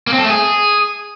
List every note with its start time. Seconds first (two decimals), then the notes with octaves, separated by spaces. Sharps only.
0.07 A#3
0.13 C4
0.18 A4
0.24 A3
0.30 G#4